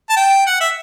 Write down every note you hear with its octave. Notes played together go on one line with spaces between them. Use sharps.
A5
G5
F#5
E5